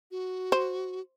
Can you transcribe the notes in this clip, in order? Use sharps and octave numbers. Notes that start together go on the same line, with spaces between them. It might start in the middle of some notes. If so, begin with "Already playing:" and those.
F#4
C5